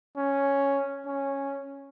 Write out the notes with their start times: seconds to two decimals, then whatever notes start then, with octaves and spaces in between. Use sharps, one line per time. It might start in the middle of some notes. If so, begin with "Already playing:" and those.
0.17 C#4
1.06 C#4